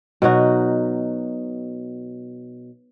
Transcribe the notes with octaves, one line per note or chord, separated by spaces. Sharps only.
B2 F#3 D#4 F#4